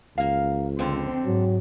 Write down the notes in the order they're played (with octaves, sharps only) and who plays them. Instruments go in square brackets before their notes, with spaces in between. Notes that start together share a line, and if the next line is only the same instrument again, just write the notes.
[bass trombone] C#2 [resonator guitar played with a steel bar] A#3 F5
[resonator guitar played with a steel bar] F2 D3 [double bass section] C4
[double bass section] G#2 [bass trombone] F#3